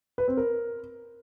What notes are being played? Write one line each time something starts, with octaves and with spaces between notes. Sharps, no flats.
B4
C4
A#4